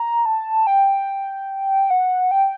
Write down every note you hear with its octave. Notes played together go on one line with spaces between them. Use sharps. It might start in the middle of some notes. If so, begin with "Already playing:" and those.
Already playing: A#5
A5
G5
F#5
G5